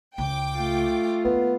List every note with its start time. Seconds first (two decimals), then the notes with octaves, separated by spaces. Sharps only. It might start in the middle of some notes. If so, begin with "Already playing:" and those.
0.18 C#2 G5 D6
0.55 A3 F4
1.25 D#2 B3